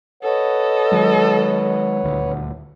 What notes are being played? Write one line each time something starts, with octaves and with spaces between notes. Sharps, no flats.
A4 B4 C#5 D#5 F#5
D#3 F#3 G#3
D#1 D2